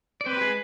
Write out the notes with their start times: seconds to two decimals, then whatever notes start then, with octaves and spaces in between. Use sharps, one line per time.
0.21 D5
0.26 C4 B4 C5
0.37 G4
0.41 G#3 G#4